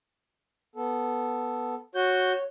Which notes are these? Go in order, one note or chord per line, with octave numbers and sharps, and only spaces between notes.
B3 A4
F#4 C#5 G6